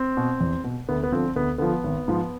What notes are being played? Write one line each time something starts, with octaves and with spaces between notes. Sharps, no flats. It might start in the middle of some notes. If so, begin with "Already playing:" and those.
Already playing: C4
B2
E2
B2
D2 B3
B3
D3 F3 C4
D2 B3
D3 F3 B3
G#1
G#2 F3